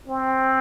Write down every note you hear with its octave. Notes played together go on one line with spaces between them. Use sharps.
C4